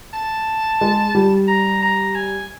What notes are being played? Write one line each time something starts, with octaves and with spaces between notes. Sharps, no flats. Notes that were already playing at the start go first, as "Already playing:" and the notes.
A5
G#3
G3
A#5
A#5
G#5